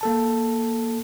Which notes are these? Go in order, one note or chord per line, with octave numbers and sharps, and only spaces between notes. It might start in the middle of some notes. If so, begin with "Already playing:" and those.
A#3 A4 A5